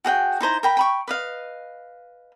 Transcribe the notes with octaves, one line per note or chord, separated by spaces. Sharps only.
F#4 G#4 F#5 G5
D#4 E4 C5 A#5
A#4 G5 B5
G5 B5 C#6
B4 D#5 F5